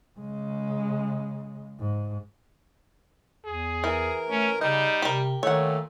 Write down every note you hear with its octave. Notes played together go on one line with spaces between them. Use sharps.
C#3 G#3
G#2
E2 G#4
E3 A#4
A3 C#4
C#3 G3 D#4
C3 G4 A#4
A#2 D#3 A3 C#5 F#5